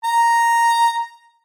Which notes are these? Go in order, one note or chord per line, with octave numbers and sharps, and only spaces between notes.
A#5